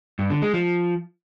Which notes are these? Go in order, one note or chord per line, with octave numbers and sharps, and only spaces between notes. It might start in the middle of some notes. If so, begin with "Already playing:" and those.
G2
D3
G#3
F3